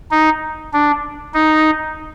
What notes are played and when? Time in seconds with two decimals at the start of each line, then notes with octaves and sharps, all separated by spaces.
0.11 D#4
0.73 D4
1.34 D#4